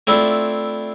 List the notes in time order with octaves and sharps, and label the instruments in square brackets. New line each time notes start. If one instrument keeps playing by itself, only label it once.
[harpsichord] A3 C4 D4 E4 F4